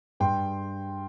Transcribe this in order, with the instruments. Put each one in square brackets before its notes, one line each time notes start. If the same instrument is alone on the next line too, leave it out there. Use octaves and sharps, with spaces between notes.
[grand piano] G2 G5 C6